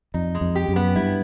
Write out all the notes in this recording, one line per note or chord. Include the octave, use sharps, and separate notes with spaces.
F2 D#4
G#3
F2
G4
F#2
B3
G2 E4